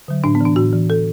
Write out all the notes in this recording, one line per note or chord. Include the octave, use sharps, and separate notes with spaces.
D3 F#3
A2 D4
B3
E3 D4
A2 F#4
E3
A4